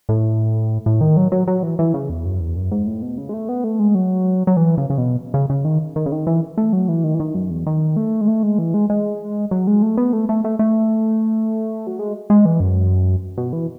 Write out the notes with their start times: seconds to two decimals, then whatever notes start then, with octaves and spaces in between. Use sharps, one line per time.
0.09 A2
0.86 A2
1.01 D#3
1.17 F#3
1.32 F#3
1.48 F#3
1.63 E3
1.79 E3
1.94 C#3
2.10 E2
2.25 F#2
2.40 E2
2.56 F#2
2.72 G#2
2.87 A2
3.02 B2
3.18 C#3
3.29 G#3
3.33 A3
3.49 B3
3.64 A3
3.79 G#3
3.95 F#3
4.47 F#3
4.57 E3
4.77 C#3
4.90 C#3
4.98 B2
5.34 C#3
5.50 C#3
5.65 D#3
5.96 D#3
6.06 C#3
6.12 D#3
6.27 E3
6.58 A3
6.73 F#3
6.88 E3
7.04 D#3
7.14 E3
7.20 D#3
7.34 F#2
7.50 E2
7.67 D#3
7.96 A3
8.21 G#3
8.28 A3
8.43 G#3
8.58 E3
8.74 G#3
8.90 G#3
9.51 F#3
9.67 G#3
9.82 A3
9.97 B3
10.13 A3
10.29 A3
10.44 A3
10.59 A3
11.87 F#3
11.99 G#3
12.30 G#3
12.45 E3
12.60 F#2
13.38 B2
13.53 E3